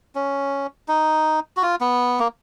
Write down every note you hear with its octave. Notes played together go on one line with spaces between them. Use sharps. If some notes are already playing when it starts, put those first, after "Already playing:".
C#4
D#4
F#4
F4
B3
A#3